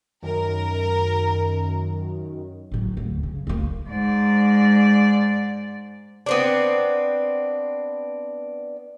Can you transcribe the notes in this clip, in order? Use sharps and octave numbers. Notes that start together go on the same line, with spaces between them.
F#2 D#3 A#4
A2 F#3
D2
C#3
D2 A#3
G#2 D5
B3 C4 D4